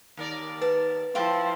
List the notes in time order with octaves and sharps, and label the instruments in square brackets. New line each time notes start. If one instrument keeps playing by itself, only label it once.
[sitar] D#2 A#4 D5
[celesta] B4 [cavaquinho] A5
[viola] F3 E4 [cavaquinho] F5 G5 A5